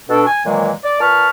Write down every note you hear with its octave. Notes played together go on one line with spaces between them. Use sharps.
B2 D4 A4
G#5
A#2 D#3 E3 F#3 G#3 A#3
D5
A#2 B4 A5 C#6 F6